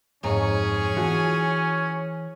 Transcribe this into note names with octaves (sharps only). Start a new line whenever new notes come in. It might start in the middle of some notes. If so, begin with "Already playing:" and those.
F2 G#2 C#4 G#4 C#5 A#5
E3 F4 F#4